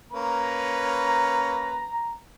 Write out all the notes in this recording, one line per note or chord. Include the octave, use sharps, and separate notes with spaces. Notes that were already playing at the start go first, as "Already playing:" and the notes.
A#3 C#4 B4 A#5